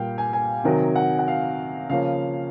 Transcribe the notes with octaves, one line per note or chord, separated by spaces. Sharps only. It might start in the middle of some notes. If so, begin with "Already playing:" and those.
Already playing: A#2 G3 F5 G5
G#5
G#5
C3 D#3 F#3
F#5
F#5
F5
C#3 F3 A#3 C#4 F5